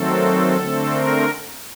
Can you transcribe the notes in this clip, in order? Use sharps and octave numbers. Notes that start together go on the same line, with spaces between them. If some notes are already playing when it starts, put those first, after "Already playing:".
Already playing: D#3 F#3 A3 C4 A4
D3 A3 C4
A#4